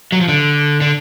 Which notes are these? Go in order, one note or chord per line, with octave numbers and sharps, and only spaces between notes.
F#3
F3
D3
D3